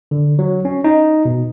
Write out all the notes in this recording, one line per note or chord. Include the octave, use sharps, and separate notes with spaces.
D3
F#3
C#4
D#4
B2